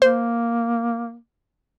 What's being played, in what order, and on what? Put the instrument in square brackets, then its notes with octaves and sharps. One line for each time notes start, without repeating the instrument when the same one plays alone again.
[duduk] A#3 [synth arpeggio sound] C5